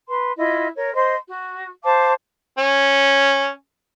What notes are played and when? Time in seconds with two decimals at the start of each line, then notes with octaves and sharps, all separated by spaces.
0.08 B4 C6
0.37 E4 F4 D#5
0.76 A#4 C#5
0.95 C5 D#5 C6
1.28 F#4
1.85 C5 F5 A5 D6
2.58 C#4